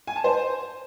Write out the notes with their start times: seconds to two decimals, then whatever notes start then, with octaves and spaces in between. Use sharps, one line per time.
0.07 G#5
0.16 A5
0.24 C5